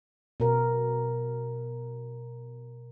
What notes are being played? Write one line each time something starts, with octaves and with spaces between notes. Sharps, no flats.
B2 A#4